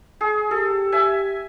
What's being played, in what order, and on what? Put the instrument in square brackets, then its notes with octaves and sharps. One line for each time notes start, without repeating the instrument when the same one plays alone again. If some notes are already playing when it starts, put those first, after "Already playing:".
[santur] G#4
[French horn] G4 [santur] A4
[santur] E5 G#5